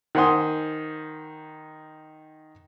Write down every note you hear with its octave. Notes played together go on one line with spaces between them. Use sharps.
D#3 C5 F#5 G#5 C6 D#6